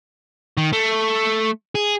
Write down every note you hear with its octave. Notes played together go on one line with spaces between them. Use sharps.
D#3
A3
G#4